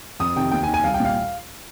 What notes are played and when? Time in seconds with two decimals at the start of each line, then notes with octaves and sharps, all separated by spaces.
0.20 F2 D#6
0.36 C3 D#3 G5
0.51 D#2 G5
0.63 G#5
0.67 D#3
0.74 G#5
0.84 C2 F5
0.94 G5
1.00 A#2 F5